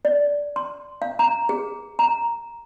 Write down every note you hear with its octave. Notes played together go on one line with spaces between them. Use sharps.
D5
C6
F5
A#5
G#4
A#5